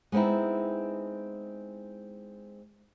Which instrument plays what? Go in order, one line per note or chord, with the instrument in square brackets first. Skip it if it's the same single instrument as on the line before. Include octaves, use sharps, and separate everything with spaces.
[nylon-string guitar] G#3 B3 C4 D#4 E4